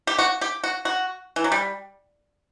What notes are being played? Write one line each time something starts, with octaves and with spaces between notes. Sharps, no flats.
G4
F#4
G4
F#4
F#4
E3
F#3
G3